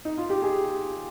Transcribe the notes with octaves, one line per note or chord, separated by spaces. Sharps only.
D#4
F4
G4
G#4